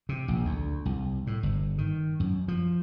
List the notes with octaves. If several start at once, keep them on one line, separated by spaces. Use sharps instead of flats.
C3
A#1
D2
C2
A2
G1
D#3
F#2
F3